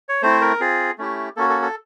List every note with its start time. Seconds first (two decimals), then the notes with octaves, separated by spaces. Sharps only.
0.09 C#5
0.22 A3 C4 E4 C5
0.41 A#4
0.60 C4 F4 G#4
0.98 A3 C#4 E4 G4
1.37 A#3 C#4 F#4 A4
1.50 A4
1.62 A4